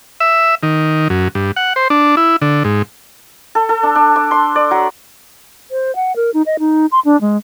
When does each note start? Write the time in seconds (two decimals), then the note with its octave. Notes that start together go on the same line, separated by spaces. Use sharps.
0.20 E5
0.63 D#3
1.10 F#2
1.35 G2
1.56 F#5
1.76 C5
1.90 D4
2.17 E4
2.42 D3
2.64 G#2
3.55 A4
3.69 A4
3.83 D4
3.95 D4
4.16 D6
4.31 C6
4.56 D5
4.71 F#3
5.69 C5
5.96 F#5
6.16 A#4
6.34 D#4
6.46 D#5
6.59 D#4
6.92 C6
7.05 D4
7.21 G#3